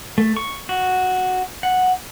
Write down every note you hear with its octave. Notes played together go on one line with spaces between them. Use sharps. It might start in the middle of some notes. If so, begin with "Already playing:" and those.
A3
C#6
F#4
F#5